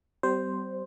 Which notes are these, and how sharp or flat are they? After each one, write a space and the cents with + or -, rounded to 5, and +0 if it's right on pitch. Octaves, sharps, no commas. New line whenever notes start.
G3 -30 C4 -40 C5 +0